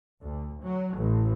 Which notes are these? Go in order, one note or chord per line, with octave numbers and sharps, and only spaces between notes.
D2
F#3
A1